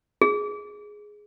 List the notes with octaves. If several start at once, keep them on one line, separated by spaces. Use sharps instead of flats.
G#4